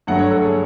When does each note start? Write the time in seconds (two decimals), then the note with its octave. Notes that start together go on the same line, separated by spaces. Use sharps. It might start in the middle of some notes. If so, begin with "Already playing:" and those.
0.07 G2 D3 F#3 A3 F#5
0.19 C#5
0.31 A4
0.42 G#4